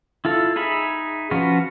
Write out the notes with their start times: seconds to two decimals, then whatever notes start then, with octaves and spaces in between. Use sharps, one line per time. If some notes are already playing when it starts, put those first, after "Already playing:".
0.25 E4 F4 A4
0.56 D#4 G#4 E5 B5
1.31 F3 C#4 F4 F#4 B4